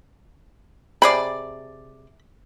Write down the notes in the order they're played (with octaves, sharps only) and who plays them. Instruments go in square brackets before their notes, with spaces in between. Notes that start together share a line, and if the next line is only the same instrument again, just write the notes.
[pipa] C3 G#4 D5 [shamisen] B5